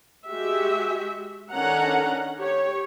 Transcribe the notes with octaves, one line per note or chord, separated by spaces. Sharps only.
G#3 F#4 G4 E5
D#3 C#4 D4 A4 F#5 A#5
G4 C#5